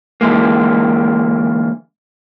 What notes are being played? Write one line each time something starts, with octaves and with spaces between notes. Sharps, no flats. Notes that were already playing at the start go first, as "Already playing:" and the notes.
D3 E3 G#3 A#3